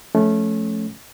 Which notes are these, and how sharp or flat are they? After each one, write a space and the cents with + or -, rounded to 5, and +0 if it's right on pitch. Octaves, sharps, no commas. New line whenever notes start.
F3 +0 A3 -15 C#4 +0